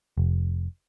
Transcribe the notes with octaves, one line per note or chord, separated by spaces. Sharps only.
F1